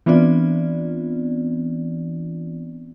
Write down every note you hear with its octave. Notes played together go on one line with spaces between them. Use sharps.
E3 B3 C4 D4 F4 D5